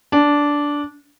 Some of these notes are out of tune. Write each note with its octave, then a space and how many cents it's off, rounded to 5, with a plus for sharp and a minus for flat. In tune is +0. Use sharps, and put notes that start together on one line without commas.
D4 -10